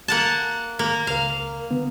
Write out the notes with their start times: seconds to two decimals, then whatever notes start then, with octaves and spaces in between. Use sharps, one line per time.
0.08 A#3 F#5 A5
0.79 A#3
1.07 C#2 A#4 F5
1.71 D3 B3